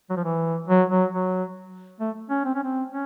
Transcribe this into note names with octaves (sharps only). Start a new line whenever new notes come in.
F#3
F3
E3
F#3
F#3
F#3
A3
C#4
C4
C#4
C4
C#4